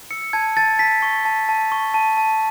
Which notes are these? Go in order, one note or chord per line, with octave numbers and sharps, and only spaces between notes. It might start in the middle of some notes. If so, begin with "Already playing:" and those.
E6 C#7
A5 G#6
A5 A6
A5 B6
C#6
A5
A5
C#6
A5
A5